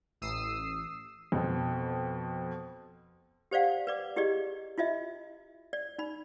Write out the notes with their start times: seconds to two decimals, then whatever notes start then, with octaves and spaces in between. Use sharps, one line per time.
0.21 A1 D#6 E6 C7
1.32 F2 B2
3.51 G4 C5 D5 F5 F#5
3.87 B4 D5 D6
4.16 E4 G4 G#4 D5 D#5
4.78 E4 F4 D#5 E5
5.73 D5
5.98 D#4 B5